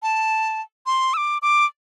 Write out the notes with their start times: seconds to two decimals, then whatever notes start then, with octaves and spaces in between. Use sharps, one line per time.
0.03 A5
0.86 C6
1.14 E6
1.17 D6
1.42 D6